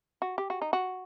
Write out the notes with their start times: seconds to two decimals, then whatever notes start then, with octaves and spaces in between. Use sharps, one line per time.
0.22 F#4
0.38 G4
0.50 F#4
0.62 D#4
0.73 F#4